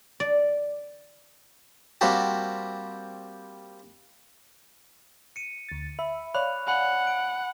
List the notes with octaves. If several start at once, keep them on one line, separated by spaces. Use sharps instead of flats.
D5
G3 A#3 C4 F#4 G4 A5
C#7 D#7
D2 A6
E5 B5
C#5 D5 F5 B5 F#6 F7
F#5 G#5 B5 F#6
D7